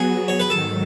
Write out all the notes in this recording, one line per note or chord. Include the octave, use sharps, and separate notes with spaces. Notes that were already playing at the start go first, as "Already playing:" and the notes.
Already playing: F#3 B3 F#4 G#4
C#5
B4
G#2 D#3 F#3 A4